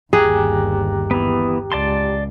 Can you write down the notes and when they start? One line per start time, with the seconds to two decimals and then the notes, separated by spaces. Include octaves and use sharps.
0.13 G1 D#2 G4 G#4 A#5 F#6
1.11 E3 B3
1.72 C#2 D5 A5 C6